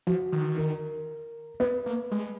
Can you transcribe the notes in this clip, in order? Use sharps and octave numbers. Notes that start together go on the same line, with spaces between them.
F3 F#4
D#3
A#4
B3 B4
A#3
G#3